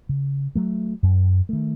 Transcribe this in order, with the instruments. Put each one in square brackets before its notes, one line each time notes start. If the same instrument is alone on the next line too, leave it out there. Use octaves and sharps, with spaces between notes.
[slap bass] C#3
F#3 A3
F#2
D#3 A3